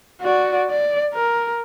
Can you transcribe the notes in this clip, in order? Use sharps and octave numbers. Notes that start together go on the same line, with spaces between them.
F#4 D5
D5
A#4